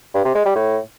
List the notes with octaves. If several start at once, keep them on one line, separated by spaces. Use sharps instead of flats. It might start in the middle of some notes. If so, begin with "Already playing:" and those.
G2
C3
G#3
G3
A2